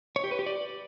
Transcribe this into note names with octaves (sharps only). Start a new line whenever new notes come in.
C#5
G4
B4
G4
D5